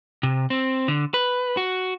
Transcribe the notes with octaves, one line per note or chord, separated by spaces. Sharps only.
C3
C4
D3
B4
F#4